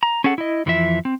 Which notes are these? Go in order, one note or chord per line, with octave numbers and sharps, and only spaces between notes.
A#5
C#4 G#4 A4 F#5
E4 D#5
F2 E3 F3 F4 E5
C4